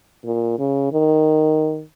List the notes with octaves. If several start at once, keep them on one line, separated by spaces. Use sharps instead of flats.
A#2
C#3
D#3